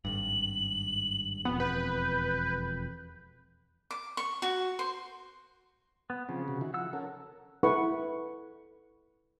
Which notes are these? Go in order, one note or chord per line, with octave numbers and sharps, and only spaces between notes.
G#1 G2 F#7
E1 F2 B3
B4 G6
D6
C#6
F#4
C5
B3
C#3 F3 C4
C3 F#4
D#3 E4 F#4
F3 F#5 E6
C#4 A4 A#4
E4 A4 B4 F#5 C#6